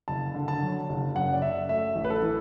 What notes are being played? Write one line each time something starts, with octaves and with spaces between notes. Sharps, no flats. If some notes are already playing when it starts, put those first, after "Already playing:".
F#1 A5
D3
A5
F#3
F#1
F#2 F#5
D5
F#2 E5
A3 E5
A1
B4
A4
E3